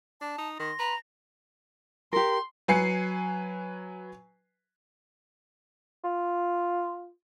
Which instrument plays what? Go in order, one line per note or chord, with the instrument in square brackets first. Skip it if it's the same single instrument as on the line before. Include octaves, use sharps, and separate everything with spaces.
[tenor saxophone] D4 [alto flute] A5
[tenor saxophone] D#4
[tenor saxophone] D#3 [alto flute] C6 [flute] A#6
[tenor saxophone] B4 [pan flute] A#5
[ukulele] G4 A#4 [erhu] C6
[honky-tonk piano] F#3 B4 G#5 C7 C#7
[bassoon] F4